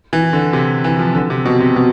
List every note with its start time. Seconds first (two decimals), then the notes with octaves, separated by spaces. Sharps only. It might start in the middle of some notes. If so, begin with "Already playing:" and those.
0.13 E3
0.33 D3
0.53 C3
0.84 E3
0.99 F3
1.15 D3
1.30 C3
1.45 B2
1.60 C3
1.76 B2